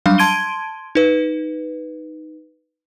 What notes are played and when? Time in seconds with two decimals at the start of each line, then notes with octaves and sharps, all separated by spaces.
0.06 F#3 G3 D4 F5
0.18 A5 C6 G#6 D7 D#7 G7
0.95 D#4 B4